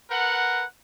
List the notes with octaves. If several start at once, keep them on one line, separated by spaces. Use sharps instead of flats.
A#4 B4 F#5